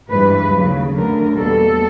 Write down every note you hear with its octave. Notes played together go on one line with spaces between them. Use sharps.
G2 E3 G#3 B4
D#2 C#3 F#3
F#2 D3 F#3 A3 A#4
E2 B2 G3 A#3 A4